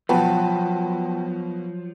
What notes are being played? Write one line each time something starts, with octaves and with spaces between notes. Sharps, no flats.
B2 F3 F#3 B4 F#5 G5 A5